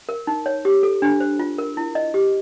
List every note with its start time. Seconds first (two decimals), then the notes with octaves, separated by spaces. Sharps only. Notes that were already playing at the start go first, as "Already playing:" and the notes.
0.09 A#4
0.27 D#4
0.46 C#5
0.65 G4
0.83 A4
1.02 D4
1.20 C5
1.39 F4
1.58 A#4
1.77 E4
1.95 D#5
2.14 G4